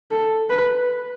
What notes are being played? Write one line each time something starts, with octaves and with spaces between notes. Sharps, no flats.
A4
B4